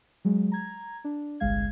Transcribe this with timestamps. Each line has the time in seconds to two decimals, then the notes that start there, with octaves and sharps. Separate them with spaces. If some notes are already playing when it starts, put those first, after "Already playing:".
0.25 F#3 G#3
0.52 A#5 G#6
1.04 D4
1.40 G1 C2 G#3 F5 G#6